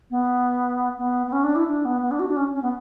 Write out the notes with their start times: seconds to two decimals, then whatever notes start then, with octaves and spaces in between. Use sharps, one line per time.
0.11 B3
0.98 B3
1.27 B3
1.32 C#4
1.44 D4
1.56 E4
1.68 D4
1.85 B3
2.02 B3
2.11 D4
2.20 F#4
2.28 D4
2.37 C#4
2.55 C#4
2.62 B3